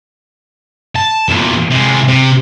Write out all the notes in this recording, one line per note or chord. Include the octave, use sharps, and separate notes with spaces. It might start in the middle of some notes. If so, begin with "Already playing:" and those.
A5
E2 A#2
C3 G#3
C3